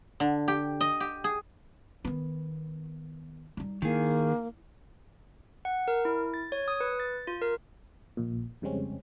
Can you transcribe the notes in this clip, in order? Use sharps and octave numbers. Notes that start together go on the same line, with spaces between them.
D3
G4
D#5
G4
G#4
D#3 B3
G3 D#4
D#3 A#3 E4 G#4
F#5
A#4
E4
A6
C#5
D#6
B4
A6
F4
A#4
A#1 A#2
F2 C#3 G3 G#3 C4 C#4